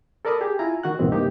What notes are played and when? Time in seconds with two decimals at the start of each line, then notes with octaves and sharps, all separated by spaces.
0.25 A4 A#4 D5 A5 B5 D#6
0.41 G4 G#4
0.59 E4 F4 G#5 A#5
0.83 D#3 F#4 F#5 F#6
0.99 C#2 G2 B2 D#3 E3 C4
1.12 G2 C3 A#3 D#4 G4